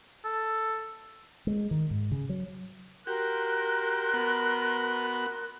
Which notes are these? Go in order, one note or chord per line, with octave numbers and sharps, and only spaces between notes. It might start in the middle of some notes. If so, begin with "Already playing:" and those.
A4
G#3
D#3
G#2
C#3
F#3
F#4 G4 A#4 C6 F#6
B3 F#4 F#5